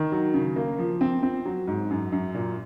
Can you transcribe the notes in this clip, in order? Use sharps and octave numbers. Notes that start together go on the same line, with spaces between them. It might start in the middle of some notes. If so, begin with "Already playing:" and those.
Already playing: D#3
F#3
C#3
A#3
F3
C4
C4
F#3
G#2
F#2
F#2
A#2